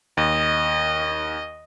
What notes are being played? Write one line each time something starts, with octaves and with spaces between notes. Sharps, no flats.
D#2 D#5